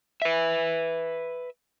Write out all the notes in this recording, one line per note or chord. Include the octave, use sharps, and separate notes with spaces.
B4 E5